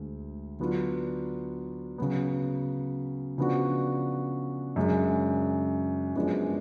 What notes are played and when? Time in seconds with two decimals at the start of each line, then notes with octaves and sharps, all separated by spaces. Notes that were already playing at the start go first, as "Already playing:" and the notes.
Already playing: D2 D3 G#3
0.60 D3 F#3 B3 D4 F4
1.98 C#3 F#3 B3
3.38 C#3 F3 B3 D4 F#4
4.76 F#2 C#3 G#3 D4
6.15 F#2 F3 G#3 B3 D4